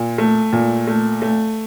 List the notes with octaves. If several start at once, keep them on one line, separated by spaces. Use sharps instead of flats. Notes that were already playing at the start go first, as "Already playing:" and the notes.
Already playing: A#2
A3
A#2
A3
A3